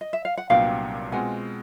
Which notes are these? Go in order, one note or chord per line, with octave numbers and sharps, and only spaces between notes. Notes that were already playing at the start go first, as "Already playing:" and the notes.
D#5
E5
F5
F#5
C2 A#2 F#3 B3 D4 F5 G5
B2 G#3 C4 F4 F#5 G#5